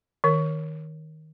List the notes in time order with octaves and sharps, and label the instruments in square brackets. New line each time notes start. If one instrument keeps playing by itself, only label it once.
[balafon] D#3 A#4